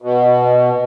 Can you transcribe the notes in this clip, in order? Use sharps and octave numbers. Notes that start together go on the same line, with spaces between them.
B2